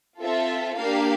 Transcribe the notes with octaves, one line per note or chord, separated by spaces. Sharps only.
C4 F4 A4 E5
A#3 D4 G4 F5